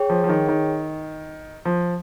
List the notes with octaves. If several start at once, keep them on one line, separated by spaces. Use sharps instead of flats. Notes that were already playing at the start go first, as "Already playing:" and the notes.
Already playing: G#4 C#5 G5
F3
F3
D#3
D#3
F3